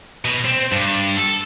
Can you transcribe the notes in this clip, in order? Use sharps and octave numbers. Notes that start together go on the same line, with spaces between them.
B2
C4
G2
A4